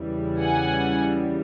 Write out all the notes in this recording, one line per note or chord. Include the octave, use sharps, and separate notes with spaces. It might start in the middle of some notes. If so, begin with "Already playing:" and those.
Already playing: E2 C#3 E3 G3
F#5 G#5